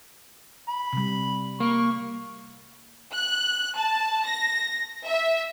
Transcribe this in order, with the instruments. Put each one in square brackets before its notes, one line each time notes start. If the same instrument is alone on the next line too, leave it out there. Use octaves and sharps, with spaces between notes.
[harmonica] B5
[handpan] C3 G3
[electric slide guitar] A#3 [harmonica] C#6
[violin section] F#6
A5
A#6
E5